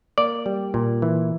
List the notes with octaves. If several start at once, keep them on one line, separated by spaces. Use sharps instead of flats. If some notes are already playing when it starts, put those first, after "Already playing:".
A#3 D5
G3
A#2
E3